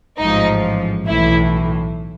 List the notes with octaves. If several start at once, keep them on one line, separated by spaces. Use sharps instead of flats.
A1 G#2 F3 D#4
B1 A2 E3 E4